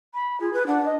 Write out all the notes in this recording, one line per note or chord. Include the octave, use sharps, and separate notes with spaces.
B5
F4 G#4
B4
D4 F#5
D#5